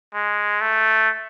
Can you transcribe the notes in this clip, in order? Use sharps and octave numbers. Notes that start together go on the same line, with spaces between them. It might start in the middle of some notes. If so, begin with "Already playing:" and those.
G#3
A3